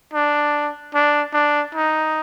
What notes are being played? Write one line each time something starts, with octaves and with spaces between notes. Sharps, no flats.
D4
D4
D4
D#4